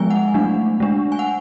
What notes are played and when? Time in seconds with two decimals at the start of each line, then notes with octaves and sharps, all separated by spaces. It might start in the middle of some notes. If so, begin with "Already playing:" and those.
Already playing: F3 G#3 B3 G#5
0.10 F#5
0.34 F#3 A3 D4
0.80 G#3 D4
1.12 G#5
1.19 F#5